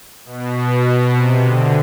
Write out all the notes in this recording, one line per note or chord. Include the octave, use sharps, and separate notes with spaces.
B2
C3
D3